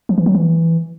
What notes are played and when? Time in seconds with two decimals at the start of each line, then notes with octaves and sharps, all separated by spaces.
0.09 F3
0.18 E3
0.26 F#3
0.35 E3